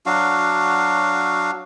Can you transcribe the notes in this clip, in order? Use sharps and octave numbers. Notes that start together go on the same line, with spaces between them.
F#3 D4 F#4 F5